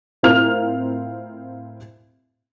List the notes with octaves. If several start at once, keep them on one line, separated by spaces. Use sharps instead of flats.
A2 C4 F4 A#4 F6 F7